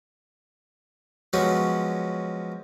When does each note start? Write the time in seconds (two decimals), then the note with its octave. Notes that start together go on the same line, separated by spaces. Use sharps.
1.33 F3 F#3 G#3 B3 C#4 F#4